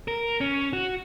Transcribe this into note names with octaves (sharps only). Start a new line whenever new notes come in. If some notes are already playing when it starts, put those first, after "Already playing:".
A#4
C#4
F#4